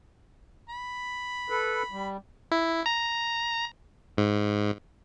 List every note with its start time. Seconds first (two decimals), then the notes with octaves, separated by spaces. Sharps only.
0.69 B5
1.50 A4 B4
1.91 G3
2.52 E4
2.86 A#5
4.17 G#2